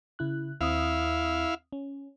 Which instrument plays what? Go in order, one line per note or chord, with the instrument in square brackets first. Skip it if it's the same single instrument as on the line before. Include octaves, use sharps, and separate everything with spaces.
[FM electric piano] C#3 E4 F#6
[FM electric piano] D#2 C4 D#6 [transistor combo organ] E4 F5
[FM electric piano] C#4